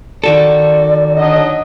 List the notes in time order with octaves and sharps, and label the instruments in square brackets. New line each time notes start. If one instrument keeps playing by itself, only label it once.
[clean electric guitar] D#3 F#4 A4 [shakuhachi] D5
[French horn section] D3 F#3 D#5